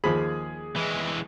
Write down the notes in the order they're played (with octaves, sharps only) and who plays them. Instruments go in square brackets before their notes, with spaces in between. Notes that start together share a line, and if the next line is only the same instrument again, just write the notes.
[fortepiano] D#2 F3 B5 [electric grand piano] G#4
[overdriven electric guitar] E3 G#3